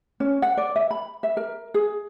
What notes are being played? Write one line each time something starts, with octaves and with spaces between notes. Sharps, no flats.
C#4
F#5
D5
E5
B5
E5
A#4
G#4